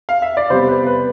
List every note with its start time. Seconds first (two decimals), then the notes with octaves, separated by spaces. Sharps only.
0.09 F5
0.22 E5
0.37 D5
0.50 C3 G3 B3 C5
0.68 B4
0.87 B4